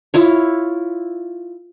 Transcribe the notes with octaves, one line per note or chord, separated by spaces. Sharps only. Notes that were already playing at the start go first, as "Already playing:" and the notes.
E4 F4 C#5